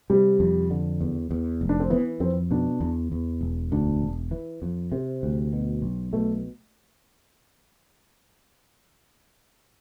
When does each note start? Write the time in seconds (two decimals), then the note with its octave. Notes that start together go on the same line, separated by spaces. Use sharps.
0.10 C3 G3
0.40 F2
0.70 D3
1.01 E2
1.31 E2
1.61 F1
1.69 D4
1.80 C4
1.90 E3 B3
2.20 F2 C4
2.51 B2 D4
2.81 E2
3.12 E2
3.41 E1
3.72 D2 D4
4.02 E1
4.31 E3
4.62 F2
4.92 C3 C4
5.23 D2
5.53 B2
5.82 B1
6.13 B2 A3